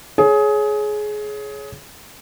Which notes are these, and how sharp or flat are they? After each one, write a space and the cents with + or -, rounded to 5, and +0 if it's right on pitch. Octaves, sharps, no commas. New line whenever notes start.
G#4 +20 C#5 +0